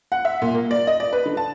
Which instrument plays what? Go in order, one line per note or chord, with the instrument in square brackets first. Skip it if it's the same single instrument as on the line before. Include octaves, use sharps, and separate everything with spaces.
[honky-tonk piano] F#5
E5
A#2
A#3
D5
D#5
D5
B4
D3
A5